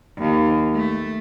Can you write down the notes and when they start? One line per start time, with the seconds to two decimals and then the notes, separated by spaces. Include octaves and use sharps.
0.18 D#2
0.74 A3